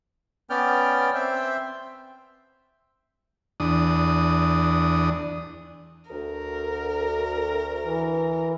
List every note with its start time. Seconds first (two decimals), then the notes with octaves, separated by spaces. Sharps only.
0.50 B3 C#4 D5 G5 F6
1.15 C4 C5 E5 G5
3.60 E2 D4 D#6
6.11 D2 A#4
7.85 E3